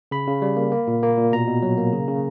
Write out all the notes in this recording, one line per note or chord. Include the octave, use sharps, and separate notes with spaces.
C#3 B5
C#3
G3
A#3
A#3
A#2
A#3
A#2
B2 A#5
B2
F#3
A#3
C#3
C#3